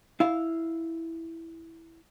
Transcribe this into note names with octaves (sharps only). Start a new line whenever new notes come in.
E4 F5